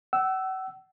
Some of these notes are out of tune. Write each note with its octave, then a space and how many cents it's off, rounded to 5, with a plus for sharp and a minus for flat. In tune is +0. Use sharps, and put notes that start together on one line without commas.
F#5 +40 E6 +0